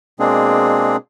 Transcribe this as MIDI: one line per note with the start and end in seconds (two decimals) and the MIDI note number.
0.20 0.96 47
0.20 0.96 56
0.20 0.96 58
0.20 0.96 60
0.20 0.96 62
0.20 0.96 68